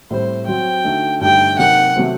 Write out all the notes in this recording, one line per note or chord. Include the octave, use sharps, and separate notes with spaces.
A2 G3 C4 C5
F#3 C4 F#4 G5
D3 A3 D#4 F#4
G2 D3 A3 D#4 G4 G5
C3 F#3 A#3 D#4 F#4 F#5
C3 F#3 A3 C4 F#4